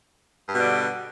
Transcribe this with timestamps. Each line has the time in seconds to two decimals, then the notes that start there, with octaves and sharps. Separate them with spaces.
0.49 G2
0.53 B2
0.57 G3
0.61 D3